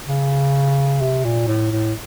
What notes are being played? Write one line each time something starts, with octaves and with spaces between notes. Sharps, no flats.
C#3
C3
A#2
A2
A2